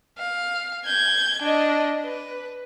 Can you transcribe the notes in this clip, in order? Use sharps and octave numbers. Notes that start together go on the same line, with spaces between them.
F5
G6 G#6
D4 D#5
B4